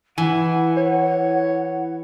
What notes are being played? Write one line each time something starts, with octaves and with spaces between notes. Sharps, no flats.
E3 E4 F#5 G#5
C#5